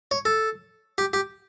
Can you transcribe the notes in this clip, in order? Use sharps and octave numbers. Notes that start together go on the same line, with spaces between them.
C#5
A4
G4
G4